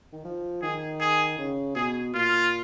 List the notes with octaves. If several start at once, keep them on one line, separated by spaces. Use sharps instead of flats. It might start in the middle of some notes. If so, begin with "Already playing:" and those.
D#3
F3
D#3 G#4
G#4
C#3
B2 G#4
A#2 F4